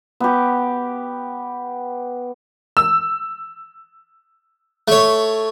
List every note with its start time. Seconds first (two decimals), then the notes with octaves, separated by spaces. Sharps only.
0.20 B3 G4
2.77 E6
4.88 A3 C#5